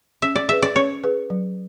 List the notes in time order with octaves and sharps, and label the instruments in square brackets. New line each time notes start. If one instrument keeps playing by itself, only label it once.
[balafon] C#4 [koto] E5
[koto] D5
[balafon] G#4 B4 [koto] E5
[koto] D5
[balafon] C#4 [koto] C#5
[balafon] G#4 B4
F#3